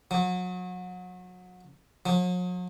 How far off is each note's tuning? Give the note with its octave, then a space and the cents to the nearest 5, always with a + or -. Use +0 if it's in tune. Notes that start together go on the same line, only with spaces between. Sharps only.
F#3 -30
F#3 -45